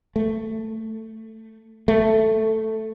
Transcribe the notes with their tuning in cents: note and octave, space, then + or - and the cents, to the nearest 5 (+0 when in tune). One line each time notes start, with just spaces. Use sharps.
A3 +10
A3 +0